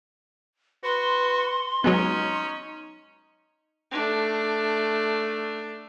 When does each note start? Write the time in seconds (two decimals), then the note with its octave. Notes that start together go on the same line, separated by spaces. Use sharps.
0.84 F#4 B4 C6
1.84 F#3 G#3 B3 C#4 D#4
3.91 A3 D4